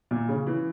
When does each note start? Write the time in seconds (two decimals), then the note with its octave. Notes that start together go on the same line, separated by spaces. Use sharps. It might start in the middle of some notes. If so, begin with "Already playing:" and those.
0.11 A#2
0.29 C#3
0.47 E3